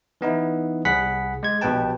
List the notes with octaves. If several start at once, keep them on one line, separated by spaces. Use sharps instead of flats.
E3 B3 D#4 E4
C2 G#4 F#5 B5 B6
G#3 G#6
A#1 B2 G4 B4 G5 A5